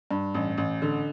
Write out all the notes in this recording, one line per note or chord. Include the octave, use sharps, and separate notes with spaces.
G2
A1
A1
D3